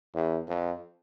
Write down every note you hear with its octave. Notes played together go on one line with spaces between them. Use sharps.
E2
F2